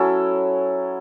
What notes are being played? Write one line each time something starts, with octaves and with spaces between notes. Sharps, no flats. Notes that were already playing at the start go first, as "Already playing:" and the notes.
Already playing: F#3 C#4 E4 A4